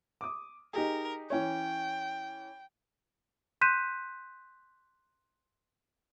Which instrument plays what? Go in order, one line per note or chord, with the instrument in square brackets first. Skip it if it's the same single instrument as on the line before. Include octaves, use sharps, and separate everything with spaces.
[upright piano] D6 D#6
[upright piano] D#4 G4 G#4 [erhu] A#4
[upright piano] E3 C#4 C#5 [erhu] G5
[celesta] C6 F#6 G6 B6 D#7 E7